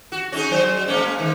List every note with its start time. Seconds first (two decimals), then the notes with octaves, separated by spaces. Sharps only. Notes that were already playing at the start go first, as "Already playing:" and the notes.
0.12 F#4
0.32 C#4 D#4 G#4
0.51 F#3 C5
0.88 G#3 A#3 C#4
1.19 G#2 D#3